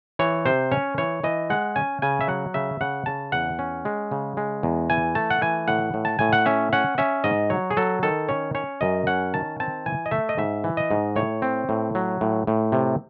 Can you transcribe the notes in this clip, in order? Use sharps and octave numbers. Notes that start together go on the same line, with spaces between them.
E3 C#5
C3 C5
C#4 C#5
E3 C#5
E3 D#5
G#3 F#5
C#4 G#5
C#3 G#5
E5
F#3 F#5
C#3 E5
C#3 F#5
C#3 A5
E2 F#5
C#4
G#3
C#3
G#3
E2
E3 G#5
A3 A5
F#5
E3 G#5
A2 F#5
A2
A5
A2 G#5
F#5
C#4 E5
C#4 F#5
C#4 E5
G#2 D#5
F#3 C#5
G#4
F#3 A4
D#3 A4
C#4 C#5
C#4 C#5
F#2 D#5
C#4 F#5
D#3 A5
C4 A5
E3 G#5
D#5
A3 E5
D#5
G#2 E5
E3
D#5
G#2
A2 C#5
C4
A2
F#3
A2
A2
C3